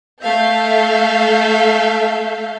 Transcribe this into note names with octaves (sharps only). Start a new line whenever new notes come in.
A3 E5 F5 G6